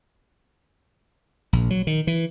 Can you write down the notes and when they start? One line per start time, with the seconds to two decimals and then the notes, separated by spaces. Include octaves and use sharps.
1.53 A#1
1.70 F#3
1.87 D#3
2.07 E3